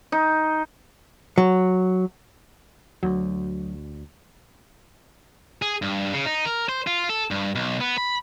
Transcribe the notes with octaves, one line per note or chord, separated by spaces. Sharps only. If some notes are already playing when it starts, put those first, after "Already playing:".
D#4
F#3
D2 F#3
G#4
G2
C#3
D#4
A#4
C5
F4
A4
G2
B1
B3
B5